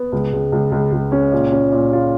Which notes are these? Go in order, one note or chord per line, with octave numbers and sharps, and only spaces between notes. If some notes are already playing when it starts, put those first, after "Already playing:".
Already playing: B3
C#2
C#2
C#2
C#2
C#2
C#4
A#2
C#4
A#2
F4